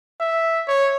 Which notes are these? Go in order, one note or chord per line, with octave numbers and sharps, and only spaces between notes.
E5
C#5